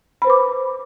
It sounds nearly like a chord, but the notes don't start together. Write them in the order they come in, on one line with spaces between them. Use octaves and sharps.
B5 C5 B4 D6